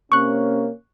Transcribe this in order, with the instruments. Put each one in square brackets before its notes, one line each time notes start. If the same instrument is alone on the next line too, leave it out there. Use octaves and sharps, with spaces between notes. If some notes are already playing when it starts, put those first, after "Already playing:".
[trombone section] C3 A#3 C#4 [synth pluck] C#6 F#6